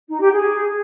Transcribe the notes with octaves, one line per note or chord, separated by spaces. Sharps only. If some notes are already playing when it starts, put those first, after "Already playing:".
D#4
G4
G#4